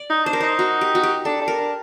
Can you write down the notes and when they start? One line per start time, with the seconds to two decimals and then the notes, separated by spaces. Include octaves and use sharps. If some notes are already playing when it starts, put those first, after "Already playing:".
Already playing: D5
0.10 D#4
0.25 D4 C5
0.33 A#4
0.40 D#4 C5
0.59 F#4
0.81 G4
0.95 F#4
1.03 G4
1.25 D4 A4
1.41 D4
1.48 A#4
1.58 D4